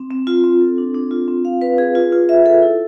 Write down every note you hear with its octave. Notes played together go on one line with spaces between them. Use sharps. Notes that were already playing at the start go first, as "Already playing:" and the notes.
Already playing: C4
C4
F4
C4
A4
D4
D4
F4
C4
F5
B4
G#4
F4
F4
E5
A4
E4